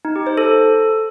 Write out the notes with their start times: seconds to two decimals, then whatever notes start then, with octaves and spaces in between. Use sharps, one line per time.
0.05 D#4
0.16 G4
0.27 C5
0.37 A4